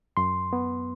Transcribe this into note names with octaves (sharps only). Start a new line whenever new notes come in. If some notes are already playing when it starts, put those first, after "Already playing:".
F#2 C6
B3